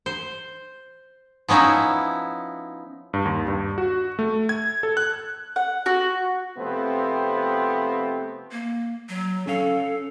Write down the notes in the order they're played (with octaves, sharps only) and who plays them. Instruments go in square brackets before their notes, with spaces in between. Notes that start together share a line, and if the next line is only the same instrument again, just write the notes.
[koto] C5
F3 B3 C#4 D#4 E4
[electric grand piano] G2
D#2
G2
F#4
A3
G#6
A4
F#6
[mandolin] F#5
F#4
[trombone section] C3 F3 A3 B3 C4 C5
[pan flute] A#3
F#3
[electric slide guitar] C#4 C#5 F5 [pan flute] A4